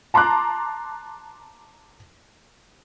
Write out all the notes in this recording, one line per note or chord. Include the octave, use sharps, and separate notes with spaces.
A5 A#5 C6 D6 F#6